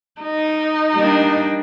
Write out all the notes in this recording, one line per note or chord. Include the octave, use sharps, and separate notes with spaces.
D#4
G3 A#3 D4